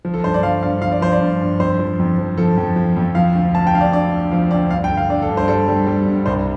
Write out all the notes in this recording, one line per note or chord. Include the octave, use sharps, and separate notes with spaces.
F3
A4
G2 C5
D5
F3 F5
G2 F5
F3 F5
D5
F3 C5
D5
G2
G2
F2 C5
F3
F2
F3
F3 A4
F2
F3
F2
F3 F5
D2
D2 A5
G5
D2 F5
D5
D3 D5
D2
F3 F5
D2 D5
G2 F5
G5
D3
F5
D3 D5
A4
G2
C5
G3 A4
G3
G3
G2
C2 C5